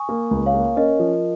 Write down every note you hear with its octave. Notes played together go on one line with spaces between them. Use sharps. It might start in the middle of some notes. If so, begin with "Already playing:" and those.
Already playing: G#5 C#6 D#6
A#3
C#2
C#5 F5
A#3
C#4 A#4 D#5
F3